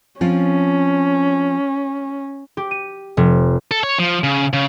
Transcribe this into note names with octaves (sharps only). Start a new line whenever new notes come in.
F3 C4 C#4 F4
G4
D#7
F1
A4
C#5
F3
C#3
C#3